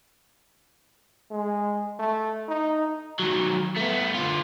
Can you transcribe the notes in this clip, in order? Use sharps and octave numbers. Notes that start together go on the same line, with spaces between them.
G#3
A3
D#4
D#3 F#3
A3 B3
D3 F4